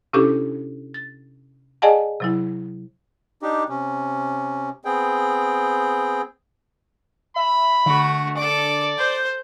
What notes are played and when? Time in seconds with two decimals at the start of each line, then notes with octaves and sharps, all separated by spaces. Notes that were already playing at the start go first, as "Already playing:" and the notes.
0.13 C3 C#4 D4 E4 G4 A4
0.94 A6
1.82 G#4 D5 D#5 F#5 G#5 A5
2.20 C3 F#3 E4
3.42 D4 D#4 G4
3.69 C3 C#4
4.85 B3 C4 G#4 G5
7.36 E5 B5
7.86 D3 A3 F#4
8.37 A4 D5 D6
8.98 C5 G6